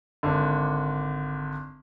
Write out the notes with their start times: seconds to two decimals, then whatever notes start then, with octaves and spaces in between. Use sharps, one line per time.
0.23 G#1 D3